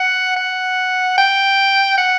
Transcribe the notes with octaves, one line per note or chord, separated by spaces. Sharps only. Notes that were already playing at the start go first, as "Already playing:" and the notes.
Already playing: F#5
F#5
G5
F#5